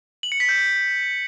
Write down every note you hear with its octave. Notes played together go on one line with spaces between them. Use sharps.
F#7
C#7
B6
G6